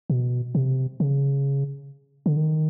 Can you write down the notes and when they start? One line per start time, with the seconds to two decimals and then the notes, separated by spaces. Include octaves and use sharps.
0.10 B2
0.55 C3
1.00 C#3
2.26 D3
2.37 D#3